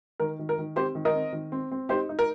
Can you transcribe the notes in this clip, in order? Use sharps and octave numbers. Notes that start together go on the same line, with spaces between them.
D#3 A#4
D#3
A#4
D#3
C4 G4 C5
D#3
A#4 D#5
C4
D#3
C4
C4
D#4 G4 C5
D#4
A#4